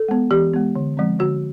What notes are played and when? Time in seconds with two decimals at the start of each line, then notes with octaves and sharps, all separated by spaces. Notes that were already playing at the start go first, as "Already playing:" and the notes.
Already playing: A4
0.09 G#3 B3
0.31 E3 G4
0.54 G#3 B3
0.76 D3
0.97 F3 G#3 C4
1.19 D3 F#4